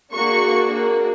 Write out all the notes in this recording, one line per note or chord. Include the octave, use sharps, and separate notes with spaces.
A#3 D4 F#4 G#4 C#6
A#3